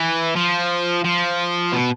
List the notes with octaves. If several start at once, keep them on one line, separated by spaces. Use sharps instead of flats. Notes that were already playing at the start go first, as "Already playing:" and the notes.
Already playing: E3
F3
F3
B2